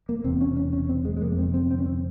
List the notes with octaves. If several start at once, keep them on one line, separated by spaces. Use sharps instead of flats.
A#3
E1 E2 C3 C4
C#4
C#4
C#4
C4
G#3
G#3
G1 F2 C3 A#3
C4
C4
C4
C#4
C4